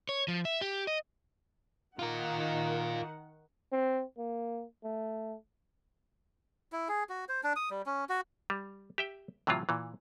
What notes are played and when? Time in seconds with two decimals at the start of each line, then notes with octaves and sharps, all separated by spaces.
0.09 C#5
0.28 F3
0.45 E5
0.61 G4
0.87 D#5
1.99 D#3 F4 A#4 F#5
3.72 C4
4.18 A#3
4.84 A3
6.72 E4
6.88 G#4
7.09 F#4
7.29 C5
7.43 D4
7.56 D#6
7.71 G3
7.86 C#4
8.09 F#4
8.50 G3
8.98 G4 E5 G5
9.47 A2 C3 E3 F#3 F4
9.69 A#2 E3